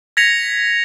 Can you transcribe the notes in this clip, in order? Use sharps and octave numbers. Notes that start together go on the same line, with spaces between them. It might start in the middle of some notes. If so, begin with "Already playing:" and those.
G#6 A#6 B6 C#7 F7